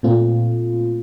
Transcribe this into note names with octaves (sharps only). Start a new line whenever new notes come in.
A#2 A3 C4 F4